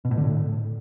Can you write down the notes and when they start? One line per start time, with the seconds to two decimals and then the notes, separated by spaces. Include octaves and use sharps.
0.05 B2
0.11 A2
0.17 D3
0.24 A2